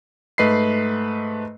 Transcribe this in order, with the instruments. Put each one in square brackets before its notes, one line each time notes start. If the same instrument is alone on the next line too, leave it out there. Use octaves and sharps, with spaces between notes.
[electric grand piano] G#2 A3 B4 D#5 B5 C7